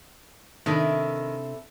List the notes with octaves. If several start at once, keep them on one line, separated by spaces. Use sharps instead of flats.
C3 D#3 D4 E4 A4 B4